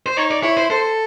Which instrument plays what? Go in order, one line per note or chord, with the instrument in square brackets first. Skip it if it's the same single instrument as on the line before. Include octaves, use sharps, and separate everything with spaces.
[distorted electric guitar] C5
[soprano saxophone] D#4 [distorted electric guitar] C#5
[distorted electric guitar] D5
[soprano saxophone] E4 [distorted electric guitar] C#5
[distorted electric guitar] C5
[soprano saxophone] A4 [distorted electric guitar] C5